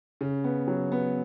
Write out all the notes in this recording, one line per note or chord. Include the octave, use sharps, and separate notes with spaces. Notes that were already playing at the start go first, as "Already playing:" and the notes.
C#3
B3
F#3
B3